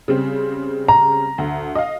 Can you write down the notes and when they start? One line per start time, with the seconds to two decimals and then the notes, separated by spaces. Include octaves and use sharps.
0.08 C#3 G3 C4
0.88 A#5
1.38 D2
1.75 D#5 F5